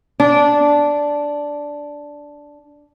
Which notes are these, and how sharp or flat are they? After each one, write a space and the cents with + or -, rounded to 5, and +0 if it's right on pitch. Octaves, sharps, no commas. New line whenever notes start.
D4 -5